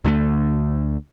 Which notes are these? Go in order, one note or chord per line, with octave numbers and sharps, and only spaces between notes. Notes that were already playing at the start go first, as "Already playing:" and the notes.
D2 D3 D#3 A3